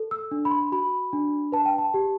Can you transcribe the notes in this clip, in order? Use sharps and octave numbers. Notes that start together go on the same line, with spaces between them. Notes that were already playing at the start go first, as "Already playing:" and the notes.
Already playing: A4
E6
D4
B5
C6
F#4 B5
D4
B4 A5
G5
A5
G4